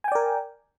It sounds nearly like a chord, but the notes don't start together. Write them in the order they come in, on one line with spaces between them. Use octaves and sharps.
G#5 G5 D5 A#4